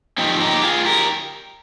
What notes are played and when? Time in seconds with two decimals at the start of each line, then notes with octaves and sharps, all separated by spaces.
0.18 G#2 F3 C4 D#4 G4
0.40 D#4 G4
0.63 F4 G#4
0.85 G4 A#4